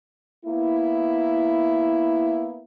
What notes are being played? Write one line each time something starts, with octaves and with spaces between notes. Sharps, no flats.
A#3 B3 E4